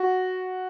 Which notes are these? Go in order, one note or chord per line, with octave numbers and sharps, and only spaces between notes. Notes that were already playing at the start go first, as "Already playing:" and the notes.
Already playing: F#4